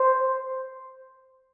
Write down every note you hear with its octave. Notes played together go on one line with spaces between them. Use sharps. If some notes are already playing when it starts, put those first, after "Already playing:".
Already playing: C5